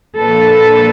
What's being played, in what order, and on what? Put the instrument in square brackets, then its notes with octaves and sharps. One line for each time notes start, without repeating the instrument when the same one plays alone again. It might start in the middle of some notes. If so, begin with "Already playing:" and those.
[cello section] A#2 F3 A#3 D4 A4 B4